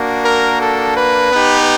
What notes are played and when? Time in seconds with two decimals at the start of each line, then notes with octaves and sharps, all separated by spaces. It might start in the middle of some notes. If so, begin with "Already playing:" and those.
Already playing: A#3 D4 F#4
0.24 A#4
0.60 A4
0.96 B4
1.32 B3 D#4 G4